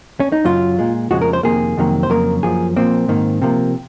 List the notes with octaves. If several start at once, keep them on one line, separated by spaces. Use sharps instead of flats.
C#4
D#4
F#2 C#3 F#3 F4
A#2 G#3
F2 C#3 F3 G#3 F#4
A#4
C5
F2 C3 D#3 A#3 G#4
F2 C3 D#3 F#3 A#3
C5
F2 C#3 F#3 A#3 A#4
F#2 F3 A#3 G#4
A#2 F3 A#3 C4
G#2 D#3 A#3
C3 F3 A#3